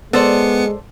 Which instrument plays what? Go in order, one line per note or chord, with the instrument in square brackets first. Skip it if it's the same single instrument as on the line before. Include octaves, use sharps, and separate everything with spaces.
[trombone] G#3 [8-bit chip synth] B3 C#7 [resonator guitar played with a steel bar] A4 C5 D5